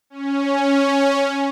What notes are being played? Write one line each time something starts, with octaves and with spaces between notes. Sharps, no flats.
C#4